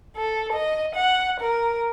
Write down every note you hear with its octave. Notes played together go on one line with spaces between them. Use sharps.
A4
D#5
F#5
A#4